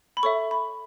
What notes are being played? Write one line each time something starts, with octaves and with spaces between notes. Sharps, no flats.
B5
A4 C#5 E5 C#6
B5